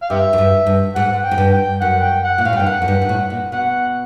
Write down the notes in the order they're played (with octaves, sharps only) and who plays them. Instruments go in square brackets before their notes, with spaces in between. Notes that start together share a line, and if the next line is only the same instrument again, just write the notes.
[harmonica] F5
[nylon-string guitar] G2 [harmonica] G4 E5
[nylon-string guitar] F#2
G2
G2
[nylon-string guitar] G#2 [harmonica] F#5
[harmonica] G5
[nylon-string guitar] G#2
G2
[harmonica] G5
[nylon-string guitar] F#2 [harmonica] F#5
[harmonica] G5
F#5
[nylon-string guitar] A#2
[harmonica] F#5
[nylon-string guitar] A2 [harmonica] F5
[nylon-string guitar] G#2
[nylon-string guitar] G2 [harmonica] G5
[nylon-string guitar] F#2 [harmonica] F#5
[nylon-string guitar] F#2
G2
G#2
A2
A#2
[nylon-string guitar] B2 [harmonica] F#5